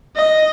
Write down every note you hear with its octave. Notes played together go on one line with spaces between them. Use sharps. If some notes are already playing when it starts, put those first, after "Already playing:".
D#5